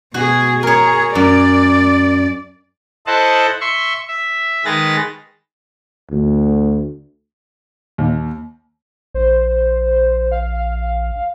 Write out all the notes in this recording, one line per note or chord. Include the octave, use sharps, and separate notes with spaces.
B2 F#4 G#4
G#4 A#4 C#5
F#2 D5
E4 A4 C5 D#5 F#5 A5
E5 C6 C#6
E5
D#3 G#3 G#4 B4 A6 A#6
D2
D#2
A#1 C5
F5